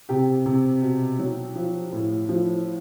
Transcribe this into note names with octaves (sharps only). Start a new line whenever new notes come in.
C3 G4
C3
B2
F#3
F3
A2
F3